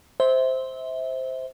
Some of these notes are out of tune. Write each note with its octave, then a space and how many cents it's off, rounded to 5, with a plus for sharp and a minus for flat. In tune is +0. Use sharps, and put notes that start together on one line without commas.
C5 +0 E5 -25